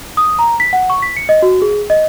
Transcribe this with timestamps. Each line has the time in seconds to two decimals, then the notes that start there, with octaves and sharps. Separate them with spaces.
0.17 D#6
0.39 A#5
0.60 B6
0.73 F#5
0.90 C#6
1.02 B6
1.17 C#7
1.29 D#5
1.42 F#4
1.62 G#4
1.90 D#5